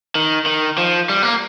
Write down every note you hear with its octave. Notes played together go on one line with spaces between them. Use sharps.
D#3
D#3
F3
G3
A#3